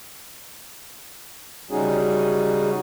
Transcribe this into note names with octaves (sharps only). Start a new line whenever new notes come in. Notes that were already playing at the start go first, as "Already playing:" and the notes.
C#3 G3 C#4 D#4 F#4 G#4